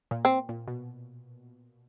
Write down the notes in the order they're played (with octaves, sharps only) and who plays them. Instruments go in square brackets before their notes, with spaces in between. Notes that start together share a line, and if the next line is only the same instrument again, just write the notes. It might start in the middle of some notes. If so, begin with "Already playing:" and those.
[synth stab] A#2
[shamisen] C4
[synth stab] A#2
B2